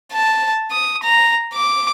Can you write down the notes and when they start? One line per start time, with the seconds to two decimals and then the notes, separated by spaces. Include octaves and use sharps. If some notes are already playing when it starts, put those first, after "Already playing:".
0.12 A5
0.71 D#6
1.03 A#5
1.54 D6